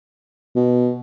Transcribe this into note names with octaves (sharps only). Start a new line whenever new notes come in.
B2